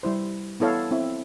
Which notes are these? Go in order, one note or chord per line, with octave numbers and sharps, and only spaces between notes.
G3 E4 C5
B3 E4 A4 C#5 F5
C4 E4 E5